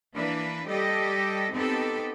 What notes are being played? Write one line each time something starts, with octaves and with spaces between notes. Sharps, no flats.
E3 A#3 D4 B4
G3 G4 A4 D#5
B3 C4 D#4 G4 A4